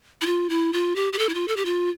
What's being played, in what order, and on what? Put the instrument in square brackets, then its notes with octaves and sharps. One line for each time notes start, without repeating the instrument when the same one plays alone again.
[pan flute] E4
F4
E4
F4
G4
G4
A4
E4
F4
A4
G4
F4